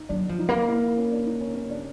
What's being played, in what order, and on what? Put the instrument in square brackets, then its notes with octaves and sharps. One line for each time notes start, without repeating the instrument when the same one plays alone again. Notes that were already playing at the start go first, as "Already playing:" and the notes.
Already playing: [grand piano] D#4
[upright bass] F#3 [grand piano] D4
[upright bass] F3
[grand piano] D#4
[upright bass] A#3
[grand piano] E4
E4
C#4
D4
D#4
C#4
C#4
D4